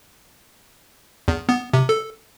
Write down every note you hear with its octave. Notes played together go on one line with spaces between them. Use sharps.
E2
B3
C3
A4